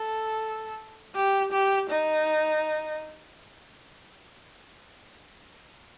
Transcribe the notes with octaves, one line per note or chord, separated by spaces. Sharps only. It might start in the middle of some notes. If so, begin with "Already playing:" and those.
Already playing: A4
G4
G4
D#4